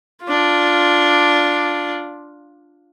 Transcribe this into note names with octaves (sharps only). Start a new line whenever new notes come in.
D4 F4